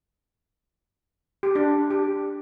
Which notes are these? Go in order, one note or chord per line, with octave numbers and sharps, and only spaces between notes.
G4
D4
G4